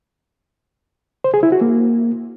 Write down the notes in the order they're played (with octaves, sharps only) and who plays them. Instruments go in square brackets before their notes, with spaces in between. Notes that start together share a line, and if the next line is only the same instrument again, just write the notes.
[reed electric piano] C5
G#4
E4
F#4
A#3